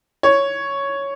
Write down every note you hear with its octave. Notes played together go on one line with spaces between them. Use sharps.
C#5